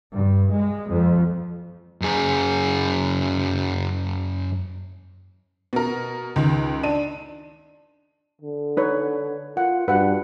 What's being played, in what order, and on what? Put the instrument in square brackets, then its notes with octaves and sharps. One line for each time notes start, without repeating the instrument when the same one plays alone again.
[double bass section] G2
G#3
F2
[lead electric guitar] F#2 G#4
[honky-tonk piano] B2 A#4
C#2 D#3
D4 D#7
[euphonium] D3
[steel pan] D#4 B4 C#5
[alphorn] F4 [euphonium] A#4 [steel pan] F#5
[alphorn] G2 [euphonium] F#4 [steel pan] B4 F#5